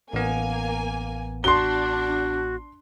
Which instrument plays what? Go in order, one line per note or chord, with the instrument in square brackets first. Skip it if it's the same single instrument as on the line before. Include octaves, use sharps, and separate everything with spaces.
[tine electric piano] A1 B3 [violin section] A#3 G#5
[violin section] D4 [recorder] F#4 [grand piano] C6 G7